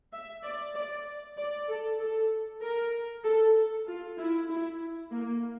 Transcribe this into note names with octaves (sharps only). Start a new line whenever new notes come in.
E5
D5
D5
D5
A4
A4
A#4
A4
F4
E4
E4
A#3